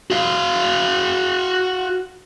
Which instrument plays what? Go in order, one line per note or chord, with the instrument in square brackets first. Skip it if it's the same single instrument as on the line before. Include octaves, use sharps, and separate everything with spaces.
[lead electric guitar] F#4 F5